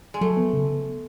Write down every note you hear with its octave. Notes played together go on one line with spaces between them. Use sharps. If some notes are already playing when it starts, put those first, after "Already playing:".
G#3
F#3 A3
B3
C#3